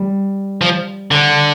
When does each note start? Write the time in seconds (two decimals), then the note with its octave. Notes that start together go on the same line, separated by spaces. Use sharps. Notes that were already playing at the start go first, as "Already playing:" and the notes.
Already playing: G3
0.61 F3
1.11 D3